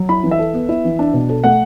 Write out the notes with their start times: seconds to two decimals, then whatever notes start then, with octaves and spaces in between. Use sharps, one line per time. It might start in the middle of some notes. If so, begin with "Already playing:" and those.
Already playing: F#3
0.09 E4 B5
0.24 E3
0.31 E5
0.39 A4
0.54 B3
0.69 E4
0.85 E3
0.99 D4
1.13 B2
1.29 A4
1.44 A3 F#5